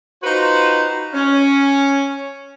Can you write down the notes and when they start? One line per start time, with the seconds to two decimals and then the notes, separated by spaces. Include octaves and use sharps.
0.23 D#4 F4 F#4 B4 C5
1.14 C#4